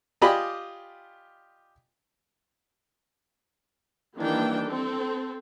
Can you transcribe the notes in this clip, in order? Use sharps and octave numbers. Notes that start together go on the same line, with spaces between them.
F4 G4 D5 D#5 G#5 B5
D#3 E3 G3 A#3 D4 G5
C4 A4